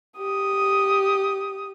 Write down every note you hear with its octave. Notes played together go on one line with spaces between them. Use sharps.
G4 D#6